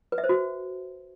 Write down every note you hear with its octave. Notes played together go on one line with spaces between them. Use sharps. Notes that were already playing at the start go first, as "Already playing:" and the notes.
B4
E5
C5
F#4